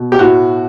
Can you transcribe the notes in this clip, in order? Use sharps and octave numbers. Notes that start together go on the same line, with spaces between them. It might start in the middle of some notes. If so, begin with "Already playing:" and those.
Already playing: B2
G4
A2 F#4